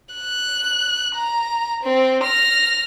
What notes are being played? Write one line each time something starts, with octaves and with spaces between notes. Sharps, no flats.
F#6
A#5
C4
F6 A#6